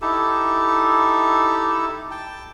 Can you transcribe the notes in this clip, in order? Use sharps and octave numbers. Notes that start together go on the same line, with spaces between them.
D#4 E4 G4 A4
G5 A5